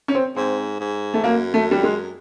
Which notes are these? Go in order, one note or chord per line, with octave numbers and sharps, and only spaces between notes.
C#4
C4
G#2 C4
G#2
A3
F#2 A#3
A3
G3
G#3